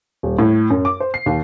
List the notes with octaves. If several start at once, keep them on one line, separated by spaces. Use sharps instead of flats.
D#1
A2
F#2
D6
C5
C7
D#2